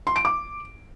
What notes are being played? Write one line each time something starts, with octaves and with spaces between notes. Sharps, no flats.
C6
D7
D6